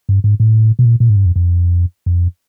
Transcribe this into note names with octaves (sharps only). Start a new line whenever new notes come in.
G2
G#2
A2
B2
A#2
A#2
G#2
G2
F2
F2
F2